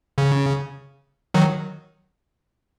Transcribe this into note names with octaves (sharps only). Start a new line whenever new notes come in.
C#3
D#3 F#3